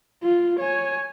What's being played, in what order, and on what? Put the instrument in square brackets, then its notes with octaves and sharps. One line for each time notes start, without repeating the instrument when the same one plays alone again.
[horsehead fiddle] F4
C#5 G#5